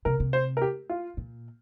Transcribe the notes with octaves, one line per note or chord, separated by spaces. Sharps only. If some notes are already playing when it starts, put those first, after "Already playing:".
C3 A#4
C3
C5
A#4
G4
F4
A#2